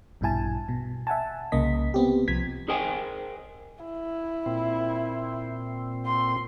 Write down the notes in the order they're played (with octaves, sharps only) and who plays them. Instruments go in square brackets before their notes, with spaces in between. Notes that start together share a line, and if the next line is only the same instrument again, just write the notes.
[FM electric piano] A#1 G2 B2 E4 G#5 A5
B2
E5 F#5 G#5 A5
C2 C#3 A#3 D#5 B6
B3 C4 G4
C2 F3 G#6 B6
[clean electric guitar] G#4 A#4 C5 D#5 G5 G#5
[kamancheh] E4
[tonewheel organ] A#2 C4
[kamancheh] C6